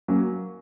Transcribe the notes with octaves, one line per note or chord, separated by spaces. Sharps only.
F#3 A#3 C#4